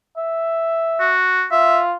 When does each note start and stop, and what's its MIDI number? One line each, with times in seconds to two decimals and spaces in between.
0.18 1.15 76
1.00 1.45 66
1.51 1.96 65
1.51 1.80 76